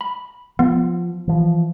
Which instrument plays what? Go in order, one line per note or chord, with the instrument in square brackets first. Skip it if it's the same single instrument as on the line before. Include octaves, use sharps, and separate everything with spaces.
[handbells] B5
[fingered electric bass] F3 [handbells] B3
[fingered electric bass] E3 F3